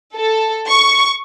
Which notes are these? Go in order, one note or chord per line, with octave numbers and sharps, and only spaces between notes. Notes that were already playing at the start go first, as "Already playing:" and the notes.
A4
C#6